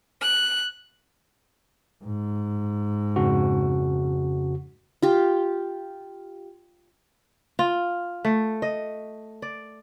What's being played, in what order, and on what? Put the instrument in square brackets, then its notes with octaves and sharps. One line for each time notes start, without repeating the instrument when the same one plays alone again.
[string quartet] F#6
[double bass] G#2
[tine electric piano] F2 C#3 F#4
[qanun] F4 G4
[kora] F4
A3
D#5
D5